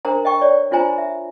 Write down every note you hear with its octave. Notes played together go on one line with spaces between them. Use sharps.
D4 A#4 C5 A#5
D#5 G5 C#6
C#5 D5
D4 F4 C5 G#5 A#5
E5